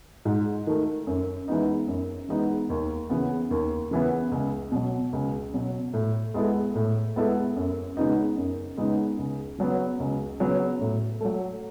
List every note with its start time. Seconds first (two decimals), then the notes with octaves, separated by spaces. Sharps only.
0.25 G#2
0.67 D#3 A3
1.07 F#2
1.48 E3 G#3 B3 D#4
1.88 F#2
2.29 E3 G#3 B3 D#4
2.70 D#2
3.10 C#3 E3 B3
3.51 D#2
3.91 C#3 E3 B3
4.32 C#2
4.72 B2 F#3
5.13 C#2
5.54 B2 F#3
5.94 A2
6.34 G#3 B3 E4 A4
6.75 A2
7.16 G#3 B3 E4 A4
7.56 F#2
7.97 C#3 G#3 B3 D#4
8.37 F#2
8.77 C#3 G#3 B3 D#4
9.19 C#2
9.58 C#3 F#3 B3
10.00 C#2
10.40 C#3 F#3 B3
10.81 A2
11.21 F#3 A3